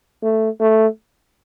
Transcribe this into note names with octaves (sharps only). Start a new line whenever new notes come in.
A3
A3